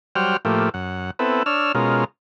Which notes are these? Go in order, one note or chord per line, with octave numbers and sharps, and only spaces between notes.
F#3 G3 C5 F#5 G5 F6
A2 F3 A3 A#3 G4
F#2 F#5
B3 C4 E4 A4 B4
D4 C#5 E6 F6
B2 G#3 C#4 F4 A#4